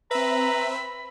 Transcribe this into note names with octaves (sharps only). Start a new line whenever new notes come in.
C4 B4 E5 A#5 B5